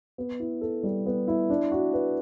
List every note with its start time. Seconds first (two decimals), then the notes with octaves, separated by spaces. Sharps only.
0.18 B3
0.40 E4
0.61 A4
0.83 G3
1.06 B3
1.28 E4
1.50 D4
1.72 F#4
1.93 B4